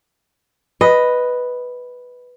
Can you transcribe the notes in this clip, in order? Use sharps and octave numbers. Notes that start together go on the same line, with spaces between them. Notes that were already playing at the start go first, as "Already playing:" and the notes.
B4 D#5